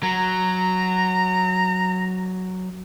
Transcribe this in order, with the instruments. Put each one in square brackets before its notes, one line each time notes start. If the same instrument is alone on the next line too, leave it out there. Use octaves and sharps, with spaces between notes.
[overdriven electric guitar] F#3 [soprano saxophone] A#5